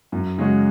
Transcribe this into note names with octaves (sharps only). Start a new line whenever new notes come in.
F#2
C#3 G#3 C#4 F#4